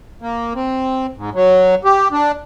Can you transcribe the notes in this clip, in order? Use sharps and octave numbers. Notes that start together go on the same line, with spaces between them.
A#3
C4
G#2
F#3
G4
D4